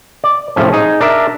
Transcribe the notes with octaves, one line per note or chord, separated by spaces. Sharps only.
D5
A2 C3 F3 C#4
D#4 G#4
D4 A#4 E5